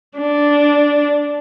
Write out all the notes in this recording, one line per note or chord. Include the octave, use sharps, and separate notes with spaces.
D4